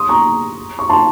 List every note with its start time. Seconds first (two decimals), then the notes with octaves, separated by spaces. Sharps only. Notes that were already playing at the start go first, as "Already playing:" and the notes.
Already playing: C6 D#6
0.09 A#5 C#6
0.79 C#6
0.89 A5 C6